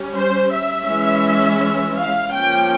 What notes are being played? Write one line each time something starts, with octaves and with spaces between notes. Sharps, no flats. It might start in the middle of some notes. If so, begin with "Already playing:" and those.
Already playing: G3 C#4
C5
E5
E3 G#3 C#4
F5
F3 A#3 C#4 G5